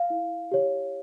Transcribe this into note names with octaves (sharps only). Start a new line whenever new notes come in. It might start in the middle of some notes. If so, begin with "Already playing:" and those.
Already playing: F5
E4
G4 C#5